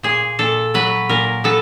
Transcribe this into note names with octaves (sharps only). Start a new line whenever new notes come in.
A#2 G#4
A#2 A4
F#3 B4
A#2 A#4
B3 A4